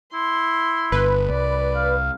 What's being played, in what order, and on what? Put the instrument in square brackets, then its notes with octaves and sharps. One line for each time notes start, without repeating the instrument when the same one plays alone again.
[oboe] E4 [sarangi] C6
[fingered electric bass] G1 [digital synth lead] B4
[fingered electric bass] C2 [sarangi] D5
[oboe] F5